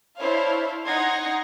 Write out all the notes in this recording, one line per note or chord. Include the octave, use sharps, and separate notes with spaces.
D4 E4 C5 C#5 F5
D#4 F#5 C6 G#6 A#6